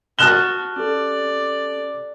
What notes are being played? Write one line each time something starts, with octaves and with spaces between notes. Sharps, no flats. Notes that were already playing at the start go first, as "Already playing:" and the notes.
F#4 A5 D#6 F6 F#6 E7 G7
C#4 G4 A4 D5